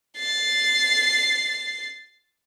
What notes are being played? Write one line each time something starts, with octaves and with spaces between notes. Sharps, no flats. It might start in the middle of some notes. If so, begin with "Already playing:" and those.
A6 C7